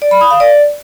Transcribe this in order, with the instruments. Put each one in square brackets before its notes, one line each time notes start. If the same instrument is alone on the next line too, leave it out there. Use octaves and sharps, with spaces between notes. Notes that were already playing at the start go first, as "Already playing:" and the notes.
[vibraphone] D5
B5
D#6
F5
D5